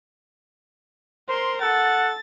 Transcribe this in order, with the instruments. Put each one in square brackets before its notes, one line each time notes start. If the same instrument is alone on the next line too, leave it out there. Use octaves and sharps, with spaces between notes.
[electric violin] A#4 C6 [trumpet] C5
[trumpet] A4 [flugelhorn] F#5 [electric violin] A6